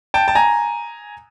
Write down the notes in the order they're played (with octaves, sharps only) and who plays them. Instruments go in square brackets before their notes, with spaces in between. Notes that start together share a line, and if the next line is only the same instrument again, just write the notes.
[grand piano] G5 A5
A5
G#5 A#5